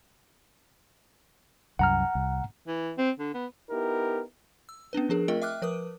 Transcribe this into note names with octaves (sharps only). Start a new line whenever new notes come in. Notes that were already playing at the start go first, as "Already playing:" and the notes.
C2 F#2 F#5 A#5 F6
C2
E3
C4
D3
B3
B3 D#4 E4 G4 A#4
E6
B3 C#4 D4 B4
F3 D4 G#4 A#4
A3 C4 F4 A#4 D#5 G5
E5 G5 D6 F6 F#6
F3 A#4 B4 D6 D#6